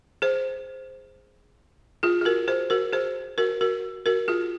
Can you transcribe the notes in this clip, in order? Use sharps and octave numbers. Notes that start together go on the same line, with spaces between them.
G#4 C5
F4 G#4
G#4
F#4 A#4
G#4 C5
F#4 A#4
G#4 C5
F#4 A#4
F#4 A#4
F#4 A#4
F4 G#4